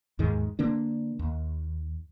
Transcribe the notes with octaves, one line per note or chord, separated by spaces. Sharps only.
D#2 G#2 D#3 G#3
D3 A#3 D4
D#2